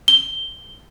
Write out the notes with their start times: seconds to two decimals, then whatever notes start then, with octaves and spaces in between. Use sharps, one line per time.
0.08 G7